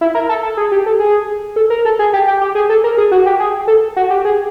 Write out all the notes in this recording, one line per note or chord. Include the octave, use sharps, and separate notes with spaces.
E4
A#4
A4
A4
G#4
G4
A4
G#4
A4
A#4
A4
G#4
G4
G4
G4
G#4
A4
A#4
G#4
F#4
G4
G#4
A4
F#4
G4
G#4